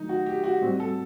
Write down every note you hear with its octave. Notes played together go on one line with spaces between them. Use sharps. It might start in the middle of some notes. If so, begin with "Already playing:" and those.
Already playing: D#3 F#3 A3 D#4
F#4
G4
F#4
A2 G3 C4 F#4
A4